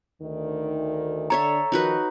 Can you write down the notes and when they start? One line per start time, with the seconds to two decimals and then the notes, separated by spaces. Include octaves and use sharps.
0.20 D2 D#3
1.30 D3 A4 C#5 E5 A#5
1.72 D#3 F3 D#4 F#4 B4